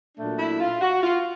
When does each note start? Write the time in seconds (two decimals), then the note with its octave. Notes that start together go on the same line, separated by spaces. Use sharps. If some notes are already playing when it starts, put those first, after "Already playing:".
0.17 A#2 F#3 A3 D4
0.39 E4
0.60 F4
0.81 F#4
1.03 F4